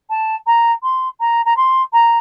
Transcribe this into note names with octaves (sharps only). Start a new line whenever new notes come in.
A5
A#5
C6
A#5
A#5
C6
A#5